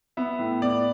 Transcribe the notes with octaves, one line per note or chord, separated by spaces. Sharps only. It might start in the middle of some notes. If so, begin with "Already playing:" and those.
B3 E5
A2
B3 D5